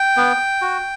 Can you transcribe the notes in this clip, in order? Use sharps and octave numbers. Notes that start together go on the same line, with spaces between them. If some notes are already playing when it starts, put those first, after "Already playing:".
Already playing: G5
B3
F#4